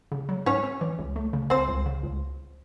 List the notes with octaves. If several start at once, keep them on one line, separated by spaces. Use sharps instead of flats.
C#3
F#3
G#2 C#4 C#5
C4
E3
C#2
A3
C#3
C#2 C4 C5
C#2
C#3
C#2